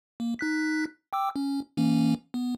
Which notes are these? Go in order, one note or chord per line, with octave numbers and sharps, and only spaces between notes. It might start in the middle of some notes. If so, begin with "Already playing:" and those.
A#3
D#4 F#6 B6
G5 D6 E6
C#4
E3 A#3 C#4
B3